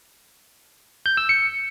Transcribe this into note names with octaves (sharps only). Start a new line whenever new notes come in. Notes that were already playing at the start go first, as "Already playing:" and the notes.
G6
E6
C#7